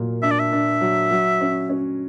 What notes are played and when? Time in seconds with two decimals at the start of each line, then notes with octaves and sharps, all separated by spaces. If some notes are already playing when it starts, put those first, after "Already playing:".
Already playing: A#2 F#3 A#3
0.23 D4 E5
0.31 D5
0.40 E5
0.52 D4
0.81 F#3
1.11 F#3
1.41 C#4
1.69 C#4